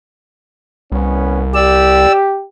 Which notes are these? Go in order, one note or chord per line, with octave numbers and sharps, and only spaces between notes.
C2 B3 C#4
G4 D5 E6